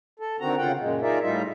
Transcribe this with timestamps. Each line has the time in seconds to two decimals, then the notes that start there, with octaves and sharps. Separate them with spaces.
0.20 A4
0.40 D3 D#3 C4 F#4 A#5
0.58 C#3 F4 F#5 G5
0.78 F#2 A#2 G#3
1.02 D#4 F4 G#4 A#4 D5 E5
1.22 A2 G3 D#4 F4 E5